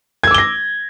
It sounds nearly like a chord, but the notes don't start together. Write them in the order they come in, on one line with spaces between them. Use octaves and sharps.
G#6 E6 D6 G7 A#6